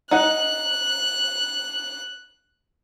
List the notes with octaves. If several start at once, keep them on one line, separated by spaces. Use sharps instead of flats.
D#4 F#5 F#6